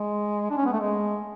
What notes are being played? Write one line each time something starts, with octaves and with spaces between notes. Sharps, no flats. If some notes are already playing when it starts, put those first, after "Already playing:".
Already playing: G#3
D4
C#4
B3
A3
G#3